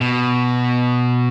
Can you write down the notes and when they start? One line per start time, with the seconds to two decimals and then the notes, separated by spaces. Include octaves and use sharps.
0.01 B2